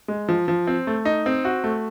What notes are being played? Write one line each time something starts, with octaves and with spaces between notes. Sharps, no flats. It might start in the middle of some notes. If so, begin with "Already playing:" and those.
G#3
F3
F3
C4
A3
D#4
C4
F#4
A3